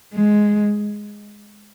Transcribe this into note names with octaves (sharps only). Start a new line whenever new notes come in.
G#3